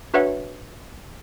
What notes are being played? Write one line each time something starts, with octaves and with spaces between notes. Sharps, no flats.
D4 F#4 B4 C#5 E5 F#5